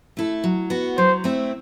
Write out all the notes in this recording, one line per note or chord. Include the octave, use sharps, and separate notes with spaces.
A3 E4 A4
F#3
B3 F#4
F#3 C5
A3 C4 E4